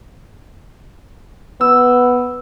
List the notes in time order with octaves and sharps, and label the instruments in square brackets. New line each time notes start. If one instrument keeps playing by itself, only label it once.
[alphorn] B3 [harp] E6